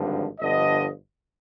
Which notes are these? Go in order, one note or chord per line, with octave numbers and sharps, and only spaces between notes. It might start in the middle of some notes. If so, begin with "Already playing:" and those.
Already playing: G#1 G2 D3 F3
G1 G2 D3 F3 D#5